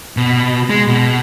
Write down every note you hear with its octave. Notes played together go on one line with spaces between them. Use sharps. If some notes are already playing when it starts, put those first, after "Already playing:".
B2
G#3
B2